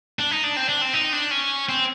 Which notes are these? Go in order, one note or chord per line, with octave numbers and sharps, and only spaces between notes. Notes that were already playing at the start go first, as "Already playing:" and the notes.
D4
D#4
D4
C4
D4
C4
D#4
D4
C#4
C4